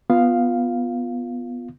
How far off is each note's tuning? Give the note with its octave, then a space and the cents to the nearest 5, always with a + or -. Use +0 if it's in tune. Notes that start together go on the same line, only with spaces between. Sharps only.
B3 +0 F4 +0 F5 +0